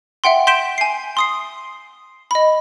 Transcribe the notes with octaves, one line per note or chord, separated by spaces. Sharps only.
E5 F#5 G5 C6
C6 G6 B6 D7 E7 G7
G#5 C7
C6 D#6 C7
D#5 B5